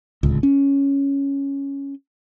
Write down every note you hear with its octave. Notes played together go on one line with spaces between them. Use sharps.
D1 C#2
C#4